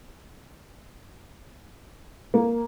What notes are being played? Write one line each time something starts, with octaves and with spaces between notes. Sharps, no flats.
A#3